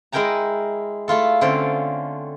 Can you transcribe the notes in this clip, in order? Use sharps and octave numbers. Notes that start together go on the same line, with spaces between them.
G#3 E4 A#4 G5 G#5 A#5
A3 E4 F4 A4
D3 C4 C#4 F4 D5